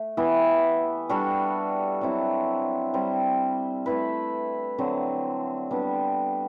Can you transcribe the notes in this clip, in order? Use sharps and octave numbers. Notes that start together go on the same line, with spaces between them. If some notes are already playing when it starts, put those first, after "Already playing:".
Already playing: A3
E3 B3 E4 G4
G3 D4 F#4 A4
F#3 C4 E4
G3 C4 G4 C5
A3 E4 B4
D3 F#3 C4
G3 B3 D4 G4